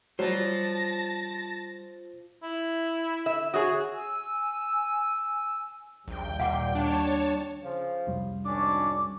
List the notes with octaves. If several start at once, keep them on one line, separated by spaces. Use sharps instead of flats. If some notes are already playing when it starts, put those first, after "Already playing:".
F#3 G3 F4 C5 A5 A#6
E4
E5
F#4 G#4 C#5
G#5 E6
A#1 D#2 G3 G5
A#2 F5 F#5 D6
D4 C#5 A5
C#3 F3
C2 F2 G3
G#1 C#4 D4 D6